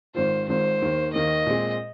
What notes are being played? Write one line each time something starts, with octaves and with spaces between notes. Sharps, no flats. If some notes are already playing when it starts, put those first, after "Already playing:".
G#1 G#2 D#3 C4 F4 C5
G#1 G#2 D#3 C4 F4 C5
D#2 D#3 A#3
D#2 D#3 A#3 D#5
A#2 G#3 C4 G#4